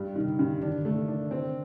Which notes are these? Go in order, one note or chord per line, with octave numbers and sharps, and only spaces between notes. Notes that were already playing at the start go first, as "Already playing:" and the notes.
Already playing: G2 G3
C3 D#3
D3
G2
D#3 D4
D3
D#3 A3
D4
C4